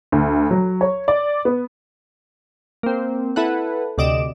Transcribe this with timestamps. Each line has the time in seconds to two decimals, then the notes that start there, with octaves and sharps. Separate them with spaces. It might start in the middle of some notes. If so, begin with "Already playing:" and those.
0.12 D2
0.51 F#3
0.81 C#5
1.08 D5
1.45 B3
2.83 A#3 C4
3.36 E4 A4 B4 F#5
3.98 D2 C3 D5 D#5 D7 E7